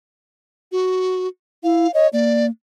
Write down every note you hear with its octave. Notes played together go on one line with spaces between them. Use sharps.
F#4
E4 F5
C#5 D#5
A#3 D5